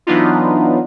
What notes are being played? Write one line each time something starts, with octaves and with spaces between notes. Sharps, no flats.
E3 F#3 B3 D4 D#4 F4